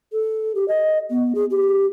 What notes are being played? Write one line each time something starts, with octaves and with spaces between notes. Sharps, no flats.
A4
G4
D#5
B3
G#4
G4